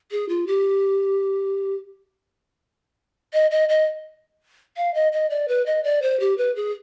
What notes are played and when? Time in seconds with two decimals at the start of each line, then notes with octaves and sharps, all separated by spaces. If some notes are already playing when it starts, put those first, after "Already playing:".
0.11 G#4
0.29 F4
0.47 G4
3.33 D#5
3.51 D#5
3.69 D#5
4.77 F5
4.94 D#5
5.12 D#5
5.30 D5
5.48 B4
5.66 D#5
5.84 D5
6.02 C5
6.20 G4
6.38 B4
6.56 G#4